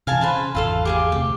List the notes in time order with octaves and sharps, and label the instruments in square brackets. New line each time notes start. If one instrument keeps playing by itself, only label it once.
[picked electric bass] C3 E3 [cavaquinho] F5 G#5 A5
[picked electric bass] C#3 [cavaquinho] B4 C5 A5
[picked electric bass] G#1 E2 [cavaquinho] F4 A4 F5
[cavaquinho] G4 G#4 F5
[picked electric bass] D2 C3 [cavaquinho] G4